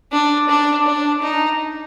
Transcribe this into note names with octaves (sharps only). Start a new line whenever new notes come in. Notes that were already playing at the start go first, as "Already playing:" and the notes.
D4
D4
D4
D#4